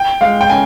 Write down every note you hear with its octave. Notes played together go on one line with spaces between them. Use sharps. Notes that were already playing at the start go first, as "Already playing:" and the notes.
Already playing: G5
G#3 F5
G5
C#3 G#5